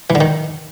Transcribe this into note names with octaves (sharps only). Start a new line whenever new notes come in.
E3
D3
D#3